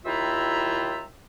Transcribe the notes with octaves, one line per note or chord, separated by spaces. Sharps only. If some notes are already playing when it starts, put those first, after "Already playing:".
D#2 E4 F4 E5 G5 A#5